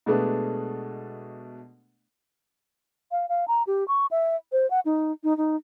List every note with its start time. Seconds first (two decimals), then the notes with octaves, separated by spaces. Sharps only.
0.06 B2 G#3 A3 D4 B4 A5
3.11 F5
3.29 F5
3.48 A#5
3.67 G4
3.88 C#6
4.11 E5
4.52 C5
4.70 F#5
4.85 D#4
5.24 D#4
5.37 D#4